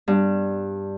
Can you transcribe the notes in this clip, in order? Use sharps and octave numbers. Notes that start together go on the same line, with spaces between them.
G2